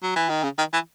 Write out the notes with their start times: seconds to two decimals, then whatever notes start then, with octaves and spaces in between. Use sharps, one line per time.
0.03 F#3
0.16 E3
0.29 D#3
0.43 C#3
0.58 D#3
0.73 E3